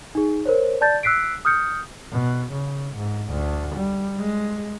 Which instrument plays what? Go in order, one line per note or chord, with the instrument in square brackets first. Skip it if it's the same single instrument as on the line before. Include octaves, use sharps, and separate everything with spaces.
[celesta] D#4 G#4
A#4 C5 C#5
D5 A5 G6 A6
E6 F#6 B6 C7 D7
D#6 F6 G6 C#7
[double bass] B2
C#3
G#2
D2
G3
G#3